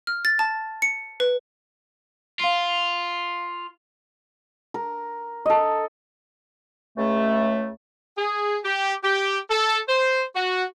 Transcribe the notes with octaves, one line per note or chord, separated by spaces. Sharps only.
F6
A6
A5
C#7
B4
F4 F5 C6 C7
A#4
A4 D#5
C#2 C#3 A3
G#4
G4
G4
A4
C5
F#4